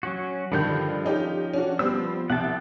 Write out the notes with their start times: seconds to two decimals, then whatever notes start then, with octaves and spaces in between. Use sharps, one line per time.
0.03 F#3 C#4 F#4
0.52 G2 D3 D#3 F3 A4 G6
1.05 C#4 D#4 G4
1.53 C#4 D4 F#4
1.79 F3 G3 B3 C4 E6
2.30 C2 F#5 G5 A5